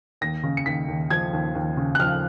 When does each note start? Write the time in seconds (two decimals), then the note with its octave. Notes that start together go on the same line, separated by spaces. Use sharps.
0.21 D#2 A#6
0.43 C#3
0.57 C#7
0.66 D#2 B6
0.88 D#2
1.10 F3 G#6
1.33 D#2
1.55 D#2
1.77 C#3
1.95 F#6
1.99 F3 F6